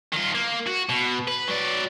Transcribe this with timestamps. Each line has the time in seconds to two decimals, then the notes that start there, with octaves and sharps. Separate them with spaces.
0.13 D#3 F4
0.35 A#3
0.67 F#4
0.89 B2
1.28 B4
1.48 F#3 D5